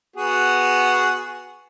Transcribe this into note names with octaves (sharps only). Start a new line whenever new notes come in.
B3 F#4 G#4